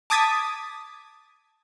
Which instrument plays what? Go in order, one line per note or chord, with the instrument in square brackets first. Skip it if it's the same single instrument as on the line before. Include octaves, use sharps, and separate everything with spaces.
[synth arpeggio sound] A5 D6 D#6 G#6 A6 B6